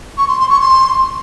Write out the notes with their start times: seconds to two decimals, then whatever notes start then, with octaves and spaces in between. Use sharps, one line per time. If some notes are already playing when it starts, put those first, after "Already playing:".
0.17 C#6
0.28 C6
0.39 C6
0.49 C#6
0.60 C6